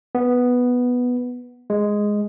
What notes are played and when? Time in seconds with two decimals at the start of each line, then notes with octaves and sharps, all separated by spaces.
0.15 B3
1.70 G#3